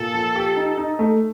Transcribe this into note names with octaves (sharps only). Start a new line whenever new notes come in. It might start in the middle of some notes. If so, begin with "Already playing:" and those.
Already playing: A#2 A4
F3
G4
D#4
D#4
A3